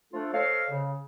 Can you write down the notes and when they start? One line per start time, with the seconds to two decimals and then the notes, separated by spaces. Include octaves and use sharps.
0.13 F3 A3 D4 F4 A4
0.33 A4 C5 C#5 D#5 F5
0.71 C#3